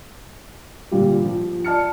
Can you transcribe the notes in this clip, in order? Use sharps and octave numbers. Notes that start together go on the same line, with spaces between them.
A#2 D3 G3 F4 G4
F3
D5 A5 F6 C#7